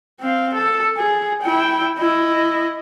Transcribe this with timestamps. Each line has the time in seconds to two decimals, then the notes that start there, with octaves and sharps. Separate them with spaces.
0.20 C4 F5
0.54 A4
0.97 G#4
1.42 E4 G5
1.98 E4 D#5